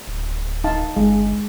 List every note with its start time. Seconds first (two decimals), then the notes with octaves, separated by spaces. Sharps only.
0.07 D1
0.64 D#4 F5 A5
0.96 G1 G#3